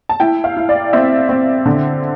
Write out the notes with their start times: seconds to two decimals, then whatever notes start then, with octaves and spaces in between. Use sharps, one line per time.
0.09 A5
0.20 E4 G5
0.44 F5
0.57 E4
0.69 D5
0.93 C4 E5
1.29 C4
1.66 D3